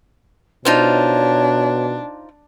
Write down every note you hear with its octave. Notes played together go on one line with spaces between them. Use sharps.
B2 D4 D#4 F4 C5 C#5